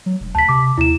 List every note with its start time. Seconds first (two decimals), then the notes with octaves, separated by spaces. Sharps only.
0.06 F#3
0.20 E1
0.35 D2 A5 B6
0.49 C3 D6
0.78 D#2 E4 E7